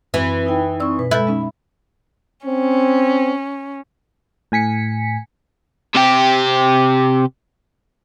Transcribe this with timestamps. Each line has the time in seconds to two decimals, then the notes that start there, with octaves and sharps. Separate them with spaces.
0.14 F#2 E3 C4
0.46 D#4 E4 G5
0.80 C4 D#4 D5 C#6 E6
0.99 B2 B4
1.11 G#3 E4 A4 F#6 G6 A6
1.27 G#3 C#4 D#4 E5
2.46 C4 C#4
4.52 A2 G#5 B6 C#7
5.95 C3 G4